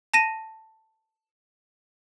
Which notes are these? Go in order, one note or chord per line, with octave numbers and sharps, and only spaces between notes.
A5 A#6 D#7